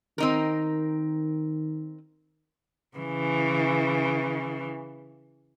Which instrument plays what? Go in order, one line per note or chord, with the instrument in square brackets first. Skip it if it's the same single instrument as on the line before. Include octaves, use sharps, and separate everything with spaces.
[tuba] D#3 [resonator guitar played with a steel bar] C4 D#4 A#4
[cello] C#3 E3